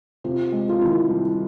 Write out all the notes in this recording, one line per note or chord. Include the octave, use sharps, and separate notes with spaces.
C3 F4
G#3
F4
D#3 E4
C2